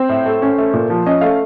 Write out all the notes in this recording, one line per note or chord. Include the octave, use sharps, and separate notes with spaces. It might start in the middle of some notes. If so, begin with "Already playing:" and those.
Already playing: C4 C5
A2
A3
C#4
A3
A#2
F3
C#4 D#5
A3 F5